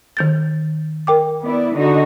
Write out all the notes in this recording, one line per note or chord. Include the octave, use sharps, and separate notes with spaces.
D#3 G6 A6
A#4 G5 D6
B3 E4 D5
D3 D#4 F#4